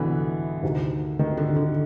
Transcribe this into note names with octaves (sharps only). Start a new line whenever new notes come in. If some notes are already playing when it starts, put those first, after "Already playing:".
Already playing: C2 B2 D3 E3 B3 E4
D2 C3 D#3
D#3
D3
D3